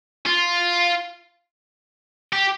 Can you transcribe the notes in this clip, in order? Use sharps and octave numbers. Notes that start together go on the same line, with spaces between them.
F4
G4